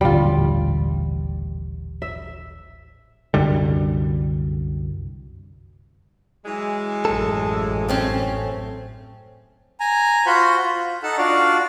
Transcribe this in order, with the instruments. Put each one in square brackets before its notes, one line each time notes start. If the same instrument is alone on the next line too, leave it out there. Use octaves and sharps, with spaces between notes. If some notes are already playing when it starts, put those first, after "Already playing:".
[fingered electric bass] D#1 A1 D3 [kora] G3 F4
[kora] E5
[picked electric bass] C2 F#2 D3 G3
[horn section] E3 F#3 G#3
[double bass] A1 F#2 [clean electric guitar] A4
[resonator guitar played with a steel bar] A3 C4 C#4
[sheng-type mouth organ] G#5 A#5
F4 F#4 C5 F#5 B5 G6
F4
D#4 A4 F#5 A5
D4 F4 F#4 D5 F5